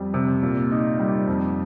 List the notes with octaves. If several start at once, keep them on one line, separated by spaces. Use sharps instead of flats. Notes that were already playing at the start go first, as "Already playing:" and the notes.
Already playing: F2 G3
C3
A#2
D#4
G3
F2